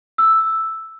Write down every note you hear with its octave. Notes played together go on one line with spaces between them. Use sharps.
E6